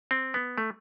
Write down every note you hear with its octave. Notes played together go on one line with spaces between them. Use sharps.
C4
B3
A3